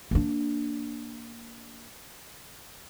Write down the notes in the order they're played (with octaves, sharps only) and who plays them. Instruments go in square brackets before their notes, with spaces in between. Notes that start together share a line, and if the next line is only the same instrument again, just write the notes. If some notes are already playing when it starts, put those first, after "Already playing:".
[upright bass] A#3 D4